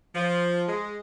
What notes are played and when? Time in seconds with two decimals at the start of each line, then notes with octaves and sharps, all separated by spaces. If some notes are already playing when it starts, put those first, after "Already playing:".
0.14 F3
0.68 G#3